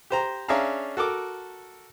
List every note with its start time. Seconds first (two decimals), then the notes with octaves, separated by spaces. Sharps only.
0.10 G4 C5 A#5
0.48 C#4 D4 G#4 E5 F5 A#5
0.97 F#4 A4 A#4 D6